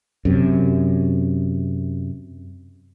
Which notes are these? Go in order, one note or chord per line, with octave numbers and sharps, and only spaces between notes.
F#2 C3